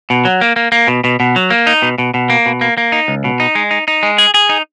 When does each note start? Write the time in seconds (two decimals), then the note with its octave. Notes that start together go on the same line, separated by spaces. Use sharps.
0.10 B2
0.25 F#3
0.41 A#3
0.56 A#3
0.72 A#3
0.88 B2
1.04 B2
1.20 B2
1.36 F#3
1.50 A#3
1.67 D#4
1.82 B2
1.98 B2
2.14 B2
2.30 A#3
2.46 B2
2.61 A#3
2.78 A#3
2.92 D#4
3.08 C#2
3.24 B2
3.40 D#4
3.55 G#3
3.71 D#4
3.88 D#4
4.03 G#3
4.18 G#4
4.34 G#4
4.49 D#4